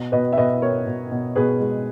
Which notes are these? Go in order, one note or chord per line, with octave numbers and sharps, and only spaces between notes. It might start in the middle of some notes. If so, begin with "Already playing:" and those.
Already playing: B2
B2 B4 D#5
E5
B2 B4 D#5
B2 A#4 C#5
B2
B2
B2 G#4 B4
G#3